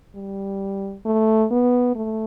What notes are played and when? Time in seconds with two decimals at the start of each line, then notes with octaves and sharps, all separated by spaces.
0.15 G3
1.05 A3
1.51 B3
1.95 A3